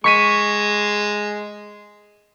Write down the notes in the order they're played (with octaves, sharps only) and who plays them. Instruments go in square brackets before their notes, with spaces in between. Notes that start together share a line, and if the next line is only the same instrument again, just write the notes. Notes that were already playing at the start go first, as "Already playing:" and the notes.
[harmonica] G#3 [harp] C#6 B6 D#7